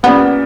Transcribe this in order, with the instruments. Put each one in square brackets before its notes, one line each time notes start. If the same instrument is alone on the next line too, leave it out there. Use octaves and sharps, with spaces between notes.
[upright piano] A#2 G3 C#4 [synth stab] B3